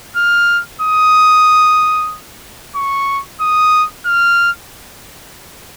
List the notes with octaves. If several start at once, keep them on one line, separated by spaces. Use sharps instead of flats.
F6
D#6
C#6
D#6
F6